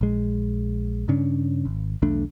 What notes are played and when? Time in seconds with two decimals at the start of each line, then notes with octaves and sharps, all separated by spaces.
0.01 A#1 G#3
1.08 G2 C#3 C#4 D4
1.65 G#1
2.02 B1 E2 A3 D4